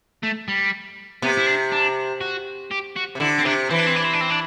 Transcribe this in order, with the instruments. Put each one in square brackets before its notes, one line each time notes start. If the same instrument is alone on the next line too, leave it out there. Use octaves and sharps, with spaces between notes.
[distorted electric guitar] A3
G3
[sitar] C3 [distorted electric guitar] B3
[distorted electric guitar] E4
D4
D4
F#4
G4
F#4
[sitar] C3
[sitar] D3 [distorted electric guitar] E4
[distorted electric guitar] C4
[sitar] C3 [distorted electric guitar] D4
[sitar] E3 [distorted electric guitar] C4
[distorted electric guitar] D4
C4
D4
C4
D4
C4
D4